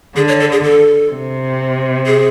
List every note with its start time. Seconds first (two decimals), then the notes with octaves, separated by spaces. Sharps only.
0.16 D3 G#4
0.28 C#5
0.40 A4
0.52 G#4
0.64 A4
1.12 C3
2.06 G#4